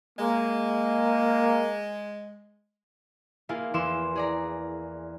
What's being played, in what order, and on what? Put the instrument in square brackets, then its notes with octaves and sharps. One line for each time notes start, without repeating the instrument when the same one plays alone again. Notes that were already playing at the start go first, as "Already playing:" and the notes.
[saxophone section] G#3 [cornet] A#3
[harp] A#3 E4 F4 G#4
E2 A#3 E4 C6 D6 E7
G#4 D5 A#5